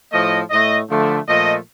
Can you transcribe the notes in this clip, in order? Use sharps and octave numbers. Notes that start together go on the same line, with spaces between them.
A2 F3 A3 D#5
A2 A3 D#5
D3 F3 A3
A#2 F3 A3 D#5